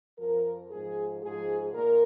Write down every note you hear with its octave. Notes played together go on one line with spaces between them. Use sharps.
F2 F3 A#4
G#2 F3 G#4
G#2 F3 G#4
A#2 A#4